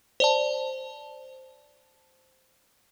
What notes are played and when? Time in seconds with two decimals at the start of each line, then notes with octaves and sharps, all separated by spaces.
0.20 C5 D5 A5